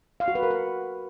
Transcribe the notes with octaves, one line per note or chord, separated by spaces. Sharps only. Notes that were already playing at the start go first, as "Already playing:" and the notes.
F5
F#4
B4
A#4
F#5